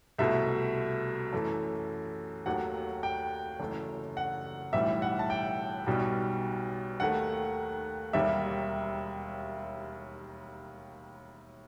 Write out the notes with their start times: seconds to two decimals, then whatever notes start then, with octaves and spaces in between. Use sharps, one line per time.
0.19 C2 B2 A3 E5
1.33 F#2 E3 A3
2.46 D#2 D#3 F#3 A3 F#5
3.03 G5
3.60 F#1 F#2 E3 A3
4.17 F#5
4.73 B1 A2 E3 G3 E5
5.02 F#5
5.19 A5
5.30 G5
5.87 B1 B2 G3
7.00 D#2 D#3 A3 F#5
8.13 E1 D#2 D#3 G3 E5